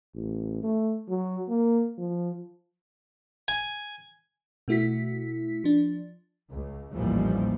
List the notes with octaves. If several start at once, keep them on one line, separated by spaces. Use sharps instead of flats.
A1
A3
F#3
A#3
F3
G#5
B2 A3 E4 F#4 B6
F3 D4
C#2
A1 D#2 A#2 E3 F3 G3